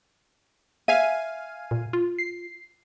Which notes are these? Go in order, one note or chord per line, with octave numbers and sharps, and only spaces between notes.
E5 F5 G#5 D#7
A#2
F4
C7